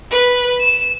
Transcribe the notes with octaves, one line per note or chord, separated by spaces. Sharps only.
B4
E7